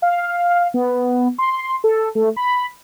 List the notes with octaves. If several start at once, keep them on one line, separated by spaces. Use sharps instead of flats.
F5
B3
C6
A4
A3
B5